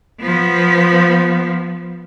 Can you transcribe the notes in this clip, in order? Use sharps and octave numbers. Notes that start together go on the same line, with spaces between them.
F3 B3